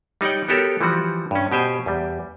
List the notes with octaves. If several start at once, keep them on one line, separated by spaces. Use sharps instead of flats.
G3 D#4 C#5 F#5 G5
B3 F#4 G4 A4 A#4 C#5
E3 F3 G3 F#4
G2 C#4
B2 G4 C5 G#5
E2 G3